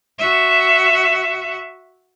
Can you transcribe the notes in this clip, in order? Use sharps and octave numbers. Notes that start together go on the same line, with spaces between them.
F#4 E5